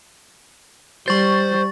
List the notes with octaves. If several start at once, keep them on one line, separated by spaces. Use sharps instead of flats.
G3 C5 C#6 A6